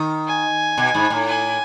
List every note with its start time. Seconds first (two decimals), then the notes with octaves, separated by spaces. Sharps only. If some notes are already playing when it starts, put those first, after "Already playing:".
Already playing: D#3
0.27 G#5
0.77 B2
0.94 G#2
1.10 A2
1.27 G#5